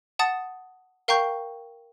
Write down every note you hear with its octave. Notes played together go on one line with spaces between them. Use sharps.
F#5 A5 D#6 A6
A#4 F5 G5 A#5 C#6 G6